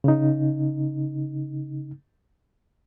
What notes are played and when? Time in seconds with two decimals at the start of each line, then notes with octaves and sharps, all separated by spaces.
0.04 C#3 D#4